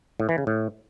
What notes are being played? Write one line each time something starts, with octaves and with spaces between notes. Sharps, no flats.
A2
E3
C#3
A2